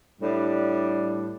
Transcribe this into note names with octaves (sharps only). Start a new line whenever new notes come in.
A2 G3 D4